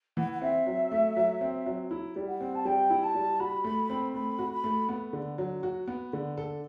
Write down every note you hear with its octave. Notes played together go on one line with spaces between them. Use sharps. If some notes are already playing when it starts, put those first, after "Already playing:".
E3 F#5
F#5
C4 E5
F#3
A3
F#3
C4
F#3
E4
G3
F#5
C4
A5
G3 G5
E4
A5
G3
F#4 B5
A3
C4
A3 B5
F#4
B5
A3
B3
D3
F#3
F#4
B3
D3
A4